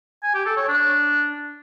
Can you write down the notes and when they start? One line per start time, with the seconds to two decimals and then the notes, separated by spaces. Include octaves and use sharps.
0.23 G#5
0.34 G4
0.46 A4
0.57 C#5
0.68 D4